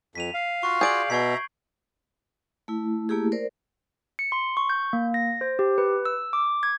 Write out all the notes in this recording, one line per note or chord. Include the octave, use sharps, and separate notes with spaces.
F2 B6 D#7 F7
F5
F4 F#4 C#6
G#4 D5 G6 D7 F#7
B2 E5 A#5 C#6 G#6 C7
A3 E4
A3 A#3 E4 G4 G#4
A#4 C5 D5
C#7
C6
C#6
G6
A#3
A#6
C5
G4
B4
E6
D6
G#6